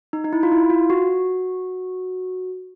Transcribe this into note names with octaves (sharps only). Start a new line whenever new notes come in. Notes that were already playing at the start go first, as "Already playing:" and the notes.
D#4
D#4
E4
F4
E4
F4
F#4